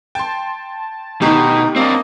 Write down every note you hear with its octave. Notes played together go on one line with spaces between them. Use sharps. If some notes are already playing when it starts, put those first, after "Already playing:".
G5 A5 C6
D2 B2 D#3 D#4 G4
A#3 C4 D4 D#5